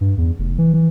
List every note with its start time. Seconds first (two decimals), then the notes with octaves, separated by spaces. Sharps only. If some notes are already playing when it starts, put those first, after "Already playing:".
0.01 G2
0.18 E2
0.39 F1
0.58 E3
0.74 E3